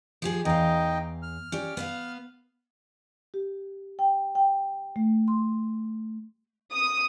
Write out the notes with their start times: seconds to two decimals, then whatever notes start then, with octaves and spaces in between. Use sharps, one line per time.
0.22 F3 G4 G#4
0.45 E2 D#4 D#5 F5 G5
1.23 F6
1.52 C#4 G4 D5
1.77 B3 E5 F5
3.34 G4
3.99 G5
4.35 G5
4.96 A3
5.28 C6
6.73 D#6